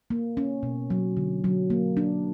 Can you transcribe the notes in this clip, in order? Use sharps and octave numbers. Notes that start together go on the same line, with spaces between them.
A#3
C#4
B2
F#3
D3
F#3
A#3
D4